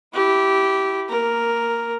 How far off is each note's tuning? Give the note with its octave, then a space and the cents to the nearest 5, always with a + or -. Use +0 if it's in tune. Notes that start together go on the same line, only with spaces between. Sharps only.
E4 +0 G4 -15
A#3 -15 A#4 +0